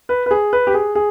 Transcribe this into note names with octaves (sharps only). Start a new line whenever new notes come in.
B4
B4
G#4
B4
G4
G#4
G#4